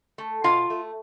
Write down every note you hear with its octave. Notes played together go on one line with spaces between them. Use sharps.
A3
B2 F4 F5
A3